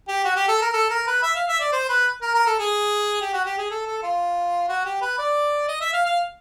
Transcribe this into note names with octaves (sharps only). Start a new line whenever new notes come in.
G4
F#4
G4
A4
A#4
A4
A#4
B4
E5
F5
E5
D5
C5
B4
A#4
A#4
A4
G#4
G4
F#4
G4
G#4
A4
A4
F4
F#4
G4
B4
D5
D#5
E5
F5
F5